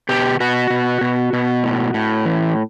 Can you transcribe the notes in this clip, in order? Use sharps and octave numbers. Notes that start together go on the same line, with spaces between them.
B2 G4
B2 F#4
B2
B2
B2
A2
A2
E3